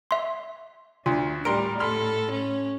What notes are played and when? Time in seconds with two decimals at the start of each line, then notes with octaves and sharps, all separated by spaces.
0.11 E5 C6
1.06 D2 D4 F4
1.45 A2 G3 A#4 A#5 C6 D7
1.80 A4 B5 C6 F6
2.31 C#4